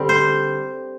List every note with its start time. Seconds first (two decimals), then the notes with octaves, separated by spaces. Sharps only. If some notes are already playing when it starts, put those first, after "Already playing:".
Already playing: D3 G3 C4 G4
0.09 C5